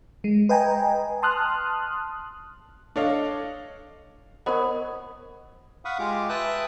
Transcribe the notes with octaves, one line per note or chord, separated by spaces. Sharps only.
G#3
B4 D#5 G5 G#5 A#5
A5 C6 D#6 F6 F#6
D4 A4 C#5 D#5 F5
B3 A#4 C5 C#5 D#5
F5 F#5 B5 C#6 D#6
G#3 F4 G4 D6
B4 E5 G5 A5 D#6 F#6